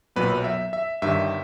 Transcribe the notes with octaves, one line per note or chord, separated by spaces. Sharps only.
B1 A#2 F#3 B3 B4
E5
E5
G1 G2 D#3 E5